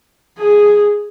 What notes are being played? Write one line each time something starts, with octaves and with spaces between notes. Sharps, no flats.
G#4